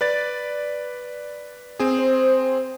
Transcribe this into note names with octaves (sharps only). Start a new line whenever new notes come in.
B4 D5 A6
C4 G#4
C5